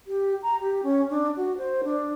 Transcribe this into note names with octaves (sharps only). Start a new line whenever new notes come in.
G4
A#5
G4
C#4
D4
F#4
C5
D4